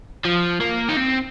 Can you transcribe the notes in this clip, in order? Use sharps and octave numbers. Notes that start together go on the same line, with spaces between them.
F3
A#3
D#4
C4